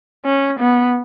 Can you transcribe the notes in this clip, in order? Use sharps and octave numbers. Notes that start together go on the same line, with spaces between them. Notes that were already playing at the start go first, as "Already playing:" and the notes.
C#4
B3